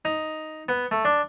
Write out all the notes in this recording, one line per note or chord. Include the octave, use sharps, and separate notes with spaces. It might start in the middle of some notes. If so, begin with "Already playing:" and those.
D#4
B3
A3
D4